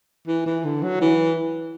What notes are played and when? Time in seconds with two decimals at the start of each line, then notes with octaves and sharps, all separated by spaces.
0.27 E3
0.46 E3
0.64 D3
0.83 F#3
1.01 E3